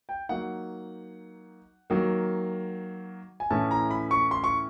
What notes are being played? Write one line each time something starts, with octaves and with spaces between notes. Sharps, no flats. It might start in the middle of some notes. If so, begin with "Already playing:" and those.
G5
F#3 A#3 D#4 F#5
D#3 F#3 A#3
G#5
A2 E3 A3 C#4 A5
A#5
B5
C#6
C6
C#6